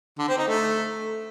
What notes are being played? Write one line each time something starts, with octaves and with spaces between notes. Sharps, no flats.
D3
C4
D#4
A3